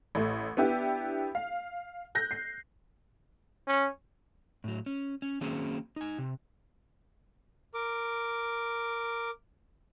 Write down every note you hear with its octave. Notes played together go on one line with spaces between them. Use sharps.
A1 A3
B3 D4 E4 G4
F5
F#6 G6 A#6
C7
C#4
A2 F#3
C#4
C#4
D#3 F#3 A#3 C4 C#4 G#4
D#4 G#5
C3
A#4 D6